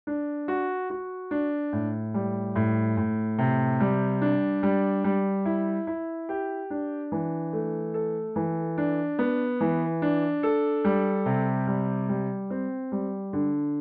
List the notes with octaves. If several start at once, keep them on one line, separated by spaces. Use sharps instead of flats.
D4
F#4
F#4
D4
A2
G3
A2
A2
C3
G3
D4
G3
G3
E4
E4
G4
D4
E3
A3
A4
E3
D4
B3
E3
D4
A4
G3
C3
G3
G3
C4
G3
D3